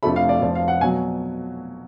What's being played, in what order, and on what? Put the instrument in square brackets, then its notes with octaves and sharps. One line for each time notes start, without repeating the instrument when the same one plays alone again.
[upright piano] F1 F2 F3 A3 D4 B5
F5
D5
F1 F2 F3 D5
F5
F#5
B2 F#3 G#5